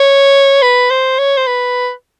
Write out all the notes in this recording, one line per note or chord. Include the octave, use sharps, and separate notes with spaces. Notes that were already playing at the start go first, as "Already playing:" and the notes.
Already playing: C#5
B4
C5
C#5
C5
B4